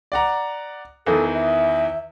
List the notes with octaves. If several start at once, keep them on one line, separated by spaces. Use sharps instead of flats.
D5 F#5 A#5
E2 D#3 E3 A4
E5